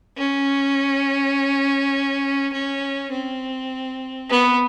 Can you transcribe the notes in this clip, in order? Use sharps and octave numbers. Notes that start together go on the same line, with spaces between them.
C#4
C#4
C4
B3